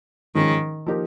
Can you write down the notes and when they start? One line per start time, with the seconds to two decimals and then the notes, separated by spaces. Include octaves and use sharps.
0.35 G#2 D#3 F3 G#3 C#4
0.86 F3 A#3 D#4 G4 A#4